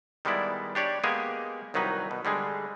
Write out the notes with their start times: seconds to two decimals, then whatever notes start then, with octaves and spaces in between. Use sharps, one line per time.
0.25 D#3 G3 G#3 B3 E4 D5
0.75 D4 G4 C#5 D5
1.04 G#3 A#3 B3 G4 G#4 G#5
1.74 C2 D#3 F#3 D#4 B4
2.11 B2
2.25 D3 G3 G#3 G#4